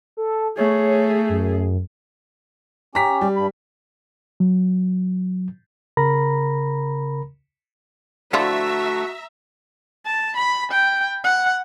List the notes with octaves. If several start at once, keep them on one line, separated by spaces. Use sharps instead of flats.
A4
A3 G#4 C#5
F#2
C#4 G4 A#5 B6
G3
G2 B5
F#3
C#3 A#4 A#5 B5 A#6
D3 F3 A3 E4 F#4 E5 A#5
A5
B5
G5
F#5